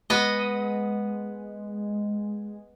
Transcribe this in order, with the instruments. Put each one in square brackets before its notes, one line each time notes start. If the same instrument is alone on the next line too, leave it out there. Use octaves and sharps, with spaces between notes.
[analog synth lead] G#3 [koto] B3 D#5